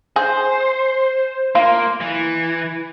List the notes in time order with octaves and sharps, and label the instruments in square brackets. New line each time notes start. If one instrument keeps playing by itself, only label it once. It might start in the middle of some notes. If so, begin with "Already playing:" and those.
[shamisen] G#4 [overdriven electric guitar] C5
[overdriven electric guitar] A#3 [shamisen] F4
[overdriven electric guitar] E3